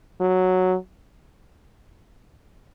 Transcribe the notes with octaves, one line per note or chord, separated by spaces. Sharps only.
F#3